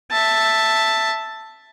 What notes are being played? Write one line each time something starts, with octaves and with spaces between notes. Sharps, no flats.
E5 A5